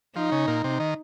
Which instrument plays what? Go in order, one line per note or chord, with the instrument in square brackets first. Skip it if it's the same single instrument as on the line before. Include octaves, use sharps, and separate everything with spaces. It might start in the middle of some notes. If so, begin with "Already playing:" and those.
[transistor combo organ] F3 [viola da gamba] D#4
[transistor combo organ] C#3
A#2
C3
D#3